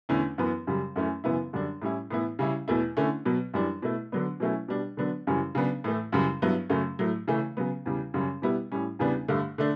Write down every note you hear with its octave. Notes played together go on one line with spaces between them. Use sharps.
E2 D3 A3 C#4 E4
F#2 E3 B3
F#2 C#3 G3
F#2 E3 A3 C#4 E4
F#2 C#3 E3 B3 E4
F#2 D3 G3 D4
A2 G3 C#4 E4
A2 E3 B3 E4
C#3 G3 C#4 E4
E2 B2 A3 E4
D3 A3 C#4 E4
B2 F#3 B3
F#2 E3 G3 D4
B2 A3 E4
D3 F#3 B3 D4
B2 F#3 A3 C#4 E4
B2 G3 D4
D3 F#3 B3 D4
F#2 C#3 E3 G3 C#4
C#3 F#3 B3 D4
A2 E3 A3
F#2 C#3 E3 G3
G2 F#3 B3 E4
F#2 C#3 F#3 A3 C#4
A2 F#3 A3
C#3 E3 A3 C#4
C#3 F#3 B3
E2 C#3 G3
F#2 C#3 G3 C#4
B2 G3 B3 E4
A2 G3 C#4
E2 C#3 G3 B3 D4
G2 D3 A3
D3 A3 D4